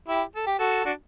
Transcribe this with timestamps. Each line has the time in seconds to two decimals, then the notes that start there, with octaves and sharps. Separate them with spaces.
0.08 E4 G4
0.36 A4
0.47 G4
0.59 F#4 A4
0.85 D4 F#4